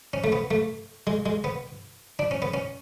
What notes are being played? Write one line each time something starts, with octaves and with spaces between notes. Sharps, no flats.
C#4
A3
B3
A3
G#3
G#3
B3
D4
C#4
B3
C#4